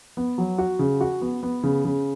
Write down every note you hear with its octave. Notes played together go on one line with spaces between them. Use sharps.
B3
F#3
F#4
C#3
F#4
B3
B3
C#3
C#3